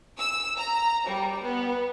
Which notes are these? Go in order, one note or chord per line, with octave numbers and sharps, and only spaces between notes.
E6
A#5
G3
B3